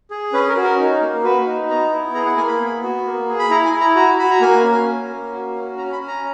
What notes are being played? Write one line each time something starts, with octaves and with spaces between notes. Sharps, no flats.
G#4
C#4 B4
A#4
F#4
A#4
D#4
A#3
F#4 B4
D#4
B3 A#5
E4
G#4 A#5
F#5
A#3 G#5
B5
B3
F#4
A#3
G#4
B5
E4 A#5
G#5
E4
A#5
F#4 A#5
F#4 B5
A#5
A#3 G#5
C#4
C#4
A#3
F#4
C#4
C#4 A#5
B5
C#4
A#5